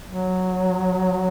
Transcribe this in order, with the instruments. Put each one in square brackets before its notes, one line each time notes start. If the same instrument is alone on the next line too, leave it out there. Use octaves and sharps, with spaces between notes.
[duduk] F#3